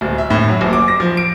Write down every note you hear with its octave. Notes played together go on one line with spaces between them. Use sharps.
D1
E5
A2
F#3
F#1
D6
A#6
F3
D7